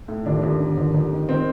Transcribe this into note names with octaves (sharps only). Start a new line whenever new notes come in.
A2
D#2 D4
D#2
D3
D#2
D#2
D#3
D#3 C4